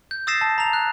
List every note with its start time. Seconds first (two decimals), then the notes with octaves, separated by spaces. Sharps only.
0.11 G6
0.27 D#6 E6 A6 A#6 C7 E7
0.41 A5
0.58 A#5 F7
0.73 F#6